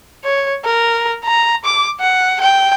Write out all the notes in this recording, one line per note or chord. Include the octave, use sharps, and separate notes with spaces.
C#5
A#4
A#5
D6
F#5
G5